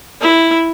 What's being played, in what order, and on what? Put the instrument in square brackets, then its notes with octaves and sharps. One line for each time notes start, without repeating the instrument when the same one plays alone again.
[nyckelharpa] E4